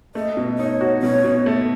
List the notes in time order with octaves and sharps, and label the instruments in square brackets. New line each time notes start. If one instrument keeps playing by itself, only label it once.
[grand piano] A3 [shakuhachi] D#5
[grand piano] B2
[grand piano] D#4 [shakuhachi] C#5
[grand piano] F#4
[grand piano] B2 [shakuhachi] C#5
[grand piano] B2
A3